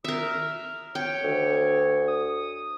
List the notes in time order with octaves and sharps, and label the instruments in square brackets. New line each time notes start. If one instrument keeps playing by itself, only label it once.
[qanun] A#4 E5 [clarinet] D#6
[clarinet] F6
[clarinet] C#5 [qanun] G5
[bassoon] D2
[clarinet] D#6